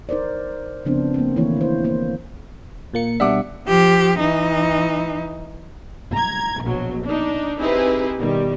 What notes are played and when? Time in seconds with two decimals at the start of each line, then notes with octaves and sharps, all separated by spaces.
0.09 D#4 A#4 C5 D5
0.85 C#3 F3 B3 C4 D4 C5
1.14 A#3 C4
1.36 D#3 E3 A3 A#3 E4 C#5
1.57 E3 C5
1.84 A#3 C5
2.94 A#2 A#3 C#7
3.20 B2 G3 D4 E5 F#5 D6
3.67 F3 G4
4.20 E3 D#4
6.13 A#5 G#6
6.62 A#1 B2 F#3
7.05 D4 D#4
7.59 C4 D#4 E4 G4 G#4 B4
8.19 B2 D#3 G3